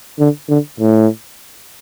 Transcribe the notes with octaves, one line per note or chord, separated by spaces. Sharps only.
D3
D3
A2